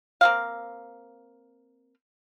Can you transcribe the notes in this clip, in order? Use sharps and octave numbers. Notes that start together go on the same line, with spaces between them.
A#3 C4 F5